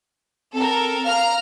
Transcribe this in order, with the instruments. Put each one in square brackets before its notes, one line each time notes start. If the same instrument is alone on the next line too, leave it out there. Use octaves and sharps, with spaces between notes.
[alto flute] C4 [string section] A4 A#4
[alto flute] F5 [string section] A#5 F6